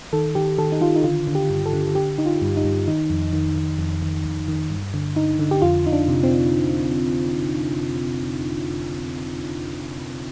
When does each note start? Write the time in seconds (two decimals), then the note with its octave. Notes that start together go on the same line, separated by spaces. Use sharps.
0.13 D#3 A4
0.35 D#3 G4
0.58 D#3 A4
0.72 D#4
0.81 D#3 F4
0.96 D#4
1.04 D3 F4
1.27 D3
1.35 G4
1.50 G2
1.66 A4
1.73 D3
1.95 D3 G4
2.18 D3 D#4
2.26 F4
2.42 G2
2.57 D#4
2.65 G2
2.87 D#3 D#4
3.10 F2
3.33 D#3
3.56 D#3
3.79 F2
4.02 D#3
4.25 F2
4.48 D#3
4.70 G2
4.94 D3
5.16 D3 D#4
5.39 D3
5.51 G4
5.62 F2 F4
5.85 F2 D#4
5.92 D4
6.08 C3
6.24 C4